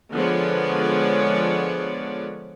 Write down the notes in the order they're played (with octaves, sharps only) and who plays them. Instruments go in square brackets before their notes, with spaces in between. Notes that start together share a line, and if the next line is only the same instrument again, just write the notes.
[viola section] D3 F3 G#3 B3 C#5 D5